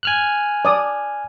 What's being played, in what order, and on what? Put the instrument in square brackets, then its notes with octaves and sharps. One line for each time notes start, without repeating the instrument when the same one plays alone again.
[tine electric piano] G#5 F6 F#6
[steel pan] D5 D#6